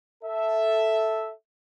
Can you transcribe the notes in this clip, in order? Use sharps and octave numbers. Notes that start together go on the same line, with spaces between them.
A4 E5